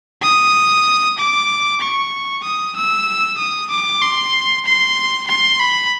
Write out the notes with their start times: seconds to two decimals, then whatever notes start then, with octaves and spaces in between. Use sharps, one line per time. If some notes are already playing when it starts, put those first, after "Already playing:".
0.23 D#6
1.18 D6
1.81 C#6
2.44 D#6
2.76 E6
3.38 D#6
3.70 D6
4.02 C6
4.66 C6
5.28 C6
5.60 B5